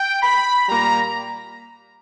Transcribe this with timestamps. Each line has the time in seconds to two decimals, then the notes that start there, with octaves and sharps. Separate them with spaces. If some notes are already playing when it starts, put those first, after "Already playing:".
Already playing: G5
0.23 B5
0.68 A#2 G3 A#3 A#5